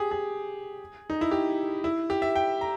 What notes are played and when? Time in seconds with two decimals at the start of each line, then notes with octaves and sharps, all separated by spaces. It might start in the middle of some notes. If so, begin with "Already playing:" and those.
Already playing: G4 G#4
0.11 G#4
1.10 D#4
1.21 E4
1.31 G4
1.84 E4
2.10 G4
2.22 E5
2.36 G5
2.61 A#5